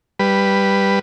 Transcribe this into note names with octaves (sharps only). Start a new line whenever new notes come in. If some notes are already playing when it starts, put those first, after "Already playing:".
G3 B4